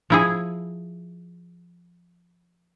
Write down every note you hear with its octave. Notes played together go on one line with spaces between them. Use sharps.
F3 E4 G#4